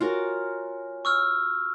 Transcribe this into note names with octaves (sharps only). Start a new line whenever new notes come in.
F4 F#4 A#4 C#5 G#5
C#6 E6 F6